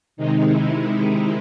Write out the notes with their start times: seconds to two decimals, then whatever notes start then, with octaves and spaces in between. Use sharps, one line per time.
0.17 C3 D#3 G#3 D#4
0.50 E4